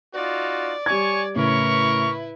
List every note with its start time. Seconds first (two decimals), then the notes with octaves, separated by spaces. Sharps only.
0.14 D#4 F4 F#4 D5
0.86 G3 C#5 G#5 C#6 G#6
1.36 A2 C#3 E4 A#4 B4 C#6